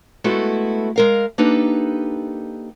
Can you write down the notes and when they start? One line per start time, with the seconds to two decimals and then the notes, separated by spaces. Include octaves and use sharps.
0.24 G#3 A3 B3 E4 F#4 A4
0.96 G#3 A#4 F5
1.38 A#3 D4 D#4 G4 A4 B4